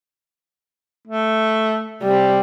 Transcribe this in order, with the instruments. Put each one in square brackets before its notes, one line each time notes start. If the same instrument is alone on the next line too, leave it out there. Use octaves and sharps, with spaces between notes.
[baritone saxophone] A3
[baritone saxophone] C3 [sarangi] G3